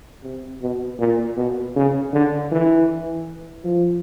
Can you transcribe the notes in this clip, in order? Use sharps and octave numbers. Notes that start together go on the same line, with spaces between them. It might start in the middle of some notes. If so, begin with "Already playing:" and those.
C3
B2
A#2
B2
C#3
D3
E3
F3